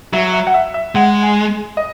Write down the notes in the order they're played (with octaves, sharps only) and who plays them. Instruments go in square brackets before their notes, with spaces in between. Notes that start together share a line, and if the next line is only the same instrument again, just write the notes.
[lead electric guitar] F#3 [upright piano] E5
[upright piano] E5
F#5
E5
E5
[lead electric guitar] G#3 [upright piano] F#5
[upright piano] G#5
D#5